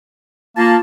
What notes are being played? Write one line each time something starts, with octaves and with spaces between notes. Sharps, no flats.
A#3 F4 A5